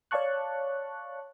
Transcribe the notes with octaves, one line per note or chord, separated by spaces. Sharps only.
C#5 D5 F5 A5 C#6 F#6